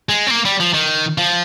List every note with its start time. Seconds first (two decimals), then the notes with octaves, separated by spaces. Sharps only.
0.09 G#3
0.27 C4
0.31 A#3
0.45 G3
0.60 F3
0.74 D#3
1.18 F3